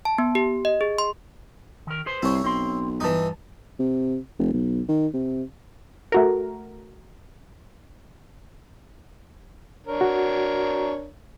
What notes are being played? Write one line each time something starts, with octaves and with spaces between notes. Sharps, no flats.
A5
B3
G4
D#5
G#4
C6
D#3 A#4
G#4 B4 C5
C2 E4 C#5
B1 C4 C6
G2 E3 D#4 A5
C3
F1
B1
D#3
C3
A3 F#4 A#4
D4 A#4 C#5
F#4